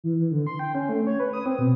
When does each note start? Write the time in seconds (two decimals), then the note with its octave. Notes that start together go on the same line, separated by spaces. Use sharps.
0.04 E3
0.19 E3
0.31 D3
0.47 C6
0.59 G5
0.75 C#4
0.89 A3
1.07 C#5
1.20 B4
1.33 D#6
1.46 C4
1.59 B2